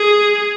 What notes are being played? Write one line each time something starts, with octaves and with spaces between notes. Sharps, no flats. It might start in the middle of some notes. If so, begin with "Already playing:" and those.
Already playing: G#4